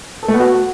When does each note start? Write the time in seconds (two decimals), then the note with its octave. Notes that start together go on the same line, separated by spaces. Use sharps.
0.23 A4
0.28 A3
0.34 B3
0.40 F#4